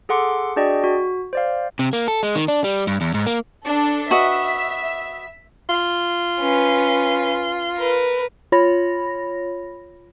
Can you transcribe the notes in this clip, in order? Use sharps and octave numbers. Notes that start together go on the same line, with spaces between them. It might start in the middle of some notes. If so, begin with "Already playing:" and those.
G#4 A4 F#5 C6 D6
D4 F#4 G#4 D5 D#5 G5
F#4
C5 D5 F5
C3
A#3
A4
G#3
D#3
D4
G3
G2
E2
G#2
A#3
D4 A4
F#4 B4 D#5 E5
F4
C#4 B4
A#4 B4
F4 C#5 B5 A#6